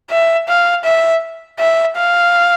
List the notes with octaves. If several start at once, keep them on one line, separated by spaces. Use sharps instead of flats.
E5
F5
E5
E5
F5